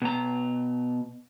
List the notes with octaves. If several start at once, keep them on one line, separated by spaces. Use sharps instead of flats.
B2 A#5